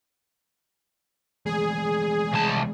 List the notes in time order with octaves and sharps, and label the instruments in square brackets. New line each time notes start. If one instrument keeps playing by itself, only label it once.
[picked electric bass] E3 G#3 A3 [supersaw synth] G#4
[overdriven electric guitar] C2 A5